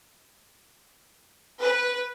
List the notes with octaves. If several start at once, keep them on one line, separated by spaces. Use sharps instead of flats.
B4